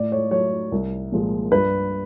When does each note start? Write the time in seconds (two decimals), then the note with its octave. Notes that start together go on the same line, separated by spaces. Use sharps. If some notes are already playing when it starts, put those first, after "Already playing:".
Already playing: A2 D5
0.12 C#5
0.31 F#3 C#5
0.72 C2
1.12 A#2 F3 G#3
1.52 G2 B4